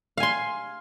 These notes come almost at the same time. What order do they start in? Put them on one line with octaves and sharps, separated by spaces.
F5 G#5 C6